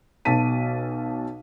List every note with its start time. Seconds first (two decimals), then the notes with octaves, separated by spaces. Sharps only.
0.25 B1 B2 A5 B6 D#7